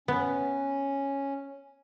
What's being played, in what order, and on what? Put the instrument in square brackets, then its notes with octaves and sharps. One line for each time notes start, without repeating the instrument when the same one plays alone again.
[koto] B3 [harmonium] C#4